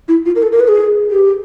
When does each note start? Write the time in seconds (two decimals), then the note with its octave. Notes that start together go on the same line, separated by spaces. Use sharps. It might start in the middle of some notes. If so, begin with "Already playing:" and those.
0.08 E4
0.26 F4
0.36 A#4
0.43 A4
0.52 A#4
0.60 B4
0.68 G#4
1.11 G4